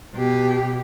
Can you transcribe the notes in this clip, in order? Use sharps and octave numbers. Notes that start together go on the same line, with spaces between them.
B2 G4